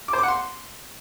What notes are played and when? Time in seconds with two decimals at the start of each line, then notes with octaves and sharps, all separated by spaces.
0.08 D6
0.13 C5
0.18 D6
0.23 F#5
0.28 C6